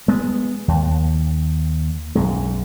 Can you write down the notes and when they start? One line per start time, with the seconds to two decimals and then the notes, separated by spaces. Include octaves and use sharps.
0.08 G#3 B3
0.68 D#2
2.15 B1 F#2 G#3